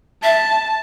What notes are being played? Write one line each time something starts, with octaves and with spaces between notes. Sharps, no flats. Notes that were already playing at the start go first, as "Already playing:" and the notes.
E5 A5